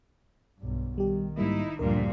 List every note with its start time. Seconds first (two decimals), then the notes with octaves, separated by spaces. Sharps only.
0.59 B1 G2
0.98 D#3 G3 G4
1.38 G#2 G3 A#3 D#4 E4
1.79 D2 G2 A#2 F3 G3 D4 A#4